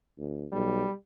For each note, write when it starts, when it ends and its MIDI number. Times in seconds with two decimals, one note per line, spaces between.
0.18 0.46 38
0.52 0.83 35
0.52 0.92 55